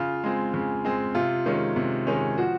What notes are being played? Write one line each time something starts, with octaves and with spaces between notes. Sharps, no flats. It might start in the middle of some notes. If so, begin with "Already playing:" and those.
Already playing: C#3 F4
G#3 C4
C#3
G#3 C4
C3 F4
D#3 G#3 C#4
C3
D#3 G#3 C#4
F3 F#4